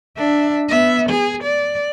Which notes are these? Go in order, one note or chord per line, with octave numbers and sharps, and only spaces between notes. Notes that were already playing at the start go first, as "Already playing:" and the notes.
D4 E5
B3 E5
G#4
D5